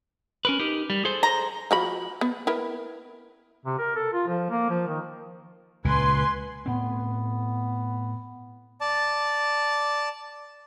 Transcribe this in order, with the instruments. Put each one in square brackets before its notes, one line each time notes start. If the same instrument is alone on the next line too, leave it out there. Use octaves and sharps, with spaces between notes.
[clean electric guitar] C#4 A#4 B4
D#4 G4 A#4
G3
G#4 A4 C5
[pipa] A#5
[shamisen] F3 F#4 B5
B3
E4 A#4 B4
[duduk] C3
A#4
A4
F4
F3
A#3
F3
D#3
[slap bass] C#2 A#2 [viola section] B4 G#5 C6
[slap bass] A2 C4 [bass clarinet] B3
[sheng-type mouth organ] D5 A5